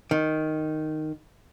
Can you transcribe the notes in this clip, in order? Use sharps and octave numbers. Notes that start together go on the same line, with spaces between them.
D#3